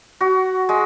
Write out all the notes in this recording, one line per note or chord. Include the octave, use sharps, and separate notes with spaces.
F#4
G#3